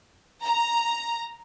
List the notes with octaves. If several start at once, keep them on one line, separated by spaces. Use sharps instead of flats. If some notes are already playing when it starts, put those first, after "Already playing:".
A#5